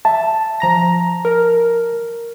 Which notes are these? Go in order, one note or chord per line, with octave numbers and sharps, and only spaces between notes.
E5 A5
F3 A#5 A#6
A#4